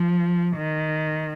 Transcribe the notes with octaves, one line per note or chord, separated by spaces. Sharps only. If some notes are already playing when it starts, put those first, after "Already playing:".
Already playing: F3
D#3